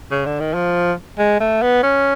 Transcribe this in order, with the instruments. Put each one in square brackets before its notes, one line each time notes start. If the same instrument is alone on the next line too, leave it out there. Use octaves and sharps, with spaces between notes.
[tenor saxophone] C#3
D3
D#3
F3
G#3
A3
B3
C#4